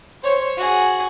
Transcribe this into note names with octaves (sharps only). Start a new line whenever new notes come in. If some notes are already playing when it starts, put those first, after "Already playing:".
C5 C#5
F#4 G#4